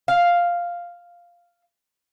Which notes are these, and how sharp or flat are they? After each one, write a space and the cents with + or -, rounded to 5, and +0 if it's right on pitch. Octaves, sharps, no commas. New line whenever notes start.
F5 +0